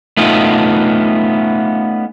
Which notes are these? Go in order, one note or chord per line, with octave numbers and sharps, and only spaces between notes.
A3 B3 C#4 D#4 F4